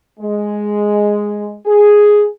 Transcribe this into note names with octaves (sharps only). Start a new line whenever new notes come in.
G#3
G#4